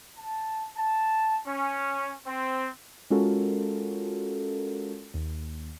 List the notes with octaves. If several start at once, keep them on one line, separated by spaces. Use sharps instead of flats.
A5
A5
C#4
C4
G#3 C#4 F4 F#4 A4 A#4
D#2